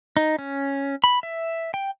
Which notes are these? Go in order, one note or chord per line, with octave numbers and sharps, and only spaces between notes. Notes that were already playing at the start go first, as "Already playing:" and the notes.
D#4
C#4
B5
E5
G5